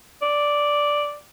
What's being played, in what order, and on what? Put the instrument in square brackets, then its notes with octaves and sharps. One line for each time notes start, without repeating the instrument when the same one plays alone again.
[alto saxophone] D5